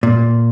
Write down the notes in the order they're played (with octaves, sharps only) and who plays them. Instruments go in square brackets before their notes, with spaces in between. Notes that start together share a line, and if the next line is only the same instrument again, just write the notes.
[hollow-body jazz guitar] A#2